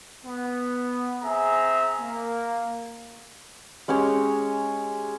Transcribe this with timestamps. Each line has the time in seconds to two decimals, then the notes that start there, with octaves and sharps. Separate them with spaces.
0.24 B3
1.23 C4 G#4 E5 A#5
1.99 A#3
3.88 G#3 C#4 G4 C#5